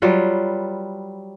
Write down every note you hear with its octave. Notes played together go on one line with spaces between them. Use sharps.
F#3 G3 F4 B4